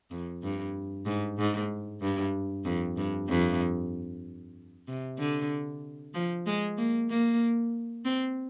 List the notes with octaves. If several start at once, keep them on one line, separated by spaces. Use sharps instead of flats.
F2
G2
G#2
G#2
G2
F2
G2
F2
C3
D3
F3
G#3
A#3
A#3
C4